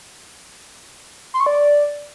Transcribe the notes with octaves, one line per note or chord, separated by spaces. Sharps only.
C6
C#6
D5